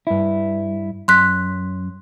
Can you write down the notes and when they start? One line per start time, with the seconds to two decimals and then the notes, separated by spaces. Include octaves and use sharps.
0.07 G2 E4
1.08 F#2 C6 F#6 B6